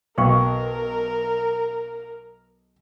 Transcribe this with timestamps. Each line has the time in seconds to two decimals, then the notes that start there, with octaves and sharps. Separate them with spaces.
0.18 B1 A#4 F5 G5 C#6